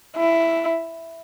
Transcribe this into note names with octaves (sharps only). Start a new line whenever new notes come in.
E4